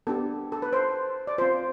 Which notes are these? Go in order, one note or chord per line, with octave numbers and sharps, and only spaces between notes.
B3 D4 G4 A4
A4
B4
C5
D5
C4 F4 C5